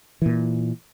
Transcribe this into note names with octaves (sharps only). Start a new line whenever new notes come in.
A#2 E3